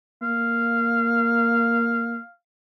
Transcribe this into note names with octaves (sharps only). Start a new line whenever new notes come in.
A#3 F5